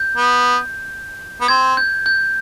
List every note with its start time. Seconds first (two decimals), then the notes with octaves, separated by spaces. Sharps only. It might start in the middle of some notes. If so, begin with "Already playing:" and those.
Already playing: G6
0.17 B3
1.41 B3
1.48 C4 G#6
1.77 G6
2.06 G6